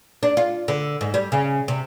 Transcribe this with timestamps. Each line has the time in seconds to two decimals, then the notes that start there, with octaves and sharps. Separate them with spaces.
0.23 D4
0.37 F4
0.68 D3
1.01 G#2
1.14 G3
1.32 C#3
1.68 C3